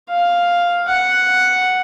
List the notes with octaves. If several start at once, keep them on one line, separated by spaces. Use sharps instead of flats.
F5
F#5